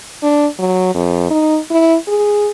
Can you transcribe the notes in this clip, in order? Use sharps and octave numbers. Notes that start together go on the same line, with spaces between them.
D4
F#3
F2
D#4
E4
G#4